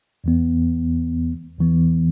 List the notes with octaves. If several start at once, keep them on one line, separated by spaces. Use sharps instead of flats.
E2 E3 B3
E2 E3 B3